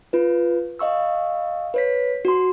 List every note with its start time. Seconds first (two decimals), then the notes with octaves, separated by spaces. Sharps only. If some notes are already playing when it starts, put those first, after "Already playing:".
0.13 F4 B4
0.79 D#5 F5 C#6 E6
1.74 B4 C#5 B6
2.25 F#4 C6